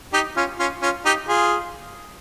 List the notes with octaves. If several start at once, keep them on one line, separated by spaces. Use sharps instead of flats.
D#4 G4
C#4 F4
C#4 F4
C#4 F4
D#4 G4
F4 G#4